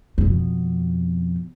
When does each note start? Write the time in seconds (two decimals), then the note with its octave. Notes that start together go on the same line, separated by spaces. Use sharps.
0.18 F2 B2